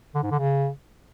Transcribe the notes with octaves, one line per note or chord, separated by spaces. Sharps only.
D3
G#2
D3
C#3